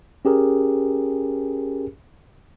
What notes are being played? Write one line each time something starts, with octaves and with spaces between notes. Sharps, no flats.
C#4 G4 G#4 A#4